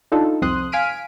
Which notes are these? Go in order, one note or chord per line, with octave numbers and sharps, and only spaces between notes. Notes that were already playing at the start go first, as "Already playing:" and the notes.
D4 D#4 F4 A4
C2 F2 C4 C6 D#6 F#6
F5 G#5 F6 B6 D7 D#7